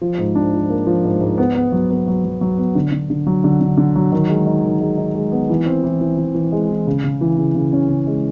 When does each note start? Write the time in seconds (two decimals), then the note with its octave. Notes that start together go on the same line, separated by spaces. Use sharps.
0.01 F3
0.18 G#2
0.35 D4
0.53 F3
0.70 A#3
0.86 F3
1.04 G#2
1.21 G#2
1.38 B3
1.55 B3
1.72 F#3
1.90 B3
2.07 F#3
2.24 F#3
2.41 F#3
2.58 B3
2.75 D3
2.92 D3
3.10 D3
3.27 F#3
3.44 D3
3.61 D3
3.78 D3
3.95 F#3
4.12 D#3
4.29 G#3
4.47 D#4
4.64 D#3
4.81 G#3
4.97 D#4
5.15 G#3
5.32 B3
5.50 E3
5.66 C4
5.84 E3
6.01 E3
6.18 E3
6.35 E3
6.52 G#3
6.70 E3
6.87 C#3
7.04 C#3
7.21 E3
7.37 C#3
7.55 C#3
7.73 C#4
7.89 C#3
8.07 G#3